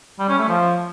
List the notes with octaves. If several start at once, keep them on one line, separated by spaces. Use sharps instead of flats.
G3
C#4
A3
F3